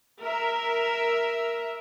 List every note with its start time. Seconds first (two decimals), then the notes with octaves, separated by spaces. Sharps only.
0.21 A#4 E5